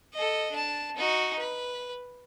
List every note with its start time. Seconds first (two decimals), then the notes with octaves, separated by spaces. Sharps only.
0.14 A4 D#5
0.51 D4 A5
0.96 D#4 F#4
1.38 B4